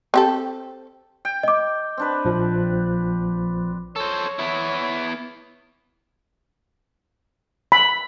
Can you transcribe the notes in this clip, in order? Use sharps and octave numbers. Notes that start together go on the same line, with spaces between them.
C4 G4 A4
G5
D#5 D6
C4 D4 B4
A#1 F3
A4 C5 C#5
B3 E4
B5